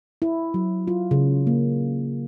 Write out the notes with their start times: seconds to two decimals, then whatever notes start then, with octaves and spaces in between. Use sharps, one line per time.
0.22 E4
0.54 F#3
0.88 F4
1.11 C#3
1.47 A#3